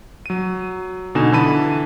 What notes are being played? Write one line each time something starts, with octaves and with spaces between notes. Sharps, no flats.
F#3 D#7
B2 D3 D#4 G#5 E7
D3 E3 A5 B5 D#7